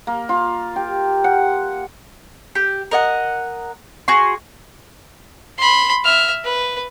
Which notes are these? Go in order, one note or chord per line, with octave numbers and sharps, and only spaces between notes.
A#3
F4
G4
F#5
G4
A#4 D#5 F#5
F#4 G#4 C6 C#6
B5 C6
E5 F6
B4